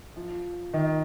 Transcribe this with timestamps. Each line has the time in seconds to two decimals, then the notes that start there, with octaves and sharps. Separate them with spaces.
0.16 F3
0.73 D#3